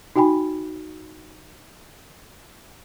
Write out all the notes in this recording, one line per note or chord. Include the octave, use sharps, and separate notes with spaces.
D#4 F#4 G5 G#5 B5